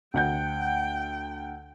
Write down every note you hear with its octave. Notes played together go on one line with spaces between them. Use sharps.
D2 F#5 G5 G6